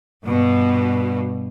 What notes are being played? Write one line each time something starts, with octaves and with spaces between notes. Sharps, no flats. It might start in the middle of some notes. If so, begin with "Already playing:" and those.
G2 B2